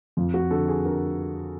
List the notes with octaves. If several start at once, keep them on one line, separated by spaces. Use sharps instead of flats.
F2 F4
F#4
D3 A4
G#4
D3 A#4